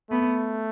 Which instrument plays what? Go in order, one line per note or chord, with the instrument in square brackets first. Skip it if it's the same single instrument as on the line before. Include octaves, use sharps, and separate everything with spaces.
[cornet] A3 [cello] B3